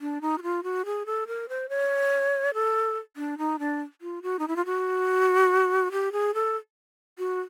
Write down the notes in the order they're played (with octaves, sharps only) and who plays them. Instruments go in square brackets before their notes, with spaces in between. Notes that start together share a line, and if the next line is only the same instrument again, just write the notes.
[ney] D4
D#4
F#4
F4
F#4
G#4
A4
A#4
C5
C#5
A4
D4
D#4
D4
F4
F#4
D#4
E4
F4
F#4
G4
G#4
A4
F#4